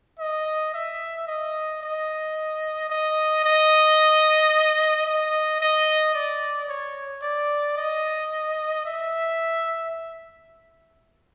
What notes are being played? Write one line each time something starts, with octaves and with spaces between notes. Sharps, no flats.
D#5
E5
D#5
D#5
D#5
D#5
D#5
D#5
D5
C#5
D5
D#5
E5